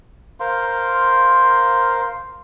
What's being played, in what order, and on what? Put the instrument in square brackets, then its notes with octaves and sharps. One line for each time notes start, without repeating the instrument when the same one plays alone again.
[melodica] A#4 C5 F5 C6